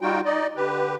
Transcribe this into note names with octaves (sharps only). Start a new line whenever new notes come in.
G3 D#4 F4 F#4 G5
D#4 D5 D#5
D3 G4 B4